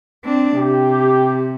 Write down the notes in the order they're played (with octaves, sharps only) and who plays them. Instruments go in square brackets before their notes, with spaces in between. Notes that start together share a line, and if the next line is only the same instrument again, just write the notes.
[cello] C4 D4
[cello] C3 [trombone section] G4